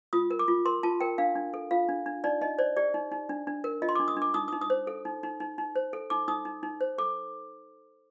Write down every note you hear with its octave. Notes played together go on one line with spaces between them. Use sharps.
F4 D#6
A#4
D6
F4
A#4 C6
F4 A5
A#4 G5
D4 F5
D4
A4
F4 F5
D4
D4
D#4 D5
D#4 D#5
C5 D5
G4 D5
D#4
D#4
D4
D4
A#4
F4 D#5
C6
D4 D6
D#6
D4
D6
D#4 D#6
D#4 D#6
D#6
C5
A4
D#4
D#4
D#4
D#4
C5
A4
D#4 D6
D#4 D#6
D#4
D#4
C5
A4 D6